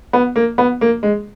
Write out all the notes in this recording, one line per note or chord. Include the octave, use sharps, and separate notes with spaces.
B3
A#3
B3
A#3
G#3